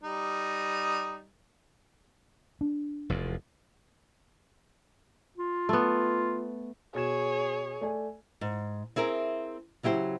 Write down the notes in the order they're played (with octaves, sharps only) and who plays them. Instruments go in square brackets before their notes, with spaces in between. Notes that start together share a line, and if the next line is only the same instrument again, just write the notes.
[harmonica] G3 D#4
[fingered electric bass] D4
[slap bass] F1 E2
[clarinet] F4
[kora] A3 B3
[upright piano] B2 G#6 E7 [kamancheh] G#4 C#5
[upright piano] A3 D5 G#5
[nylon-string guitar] G#2
C4 E4 G#4 A#4
C#3 F#3 E4 G4 C5